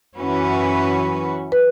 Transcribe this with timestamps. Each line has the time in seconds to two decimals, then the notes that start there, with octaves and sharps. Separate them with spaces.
0.18 F#2 E3 C#4 F#4 B4
1.52 B4